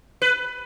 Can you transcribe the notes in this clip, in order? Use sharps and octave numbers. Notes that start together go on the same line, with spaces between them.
B4